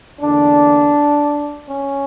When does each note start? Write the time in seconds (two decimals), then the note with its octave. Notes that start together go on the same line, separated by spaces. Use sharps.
0.20 E2 D3 A#3 D4
1.69 C#4